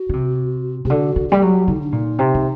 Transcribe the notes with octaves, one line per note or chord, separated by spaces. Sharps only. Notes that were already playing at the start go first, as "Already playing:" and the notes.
Already playing: F#4
D3
C3
C3 G4
D3 F#4
D3
G3 G4
F#3
D3 D#4
D4
A#2 D#4
C3
D#3